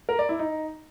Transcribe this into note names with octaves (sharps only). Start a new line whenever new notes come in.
A#4
D5
E4
D#4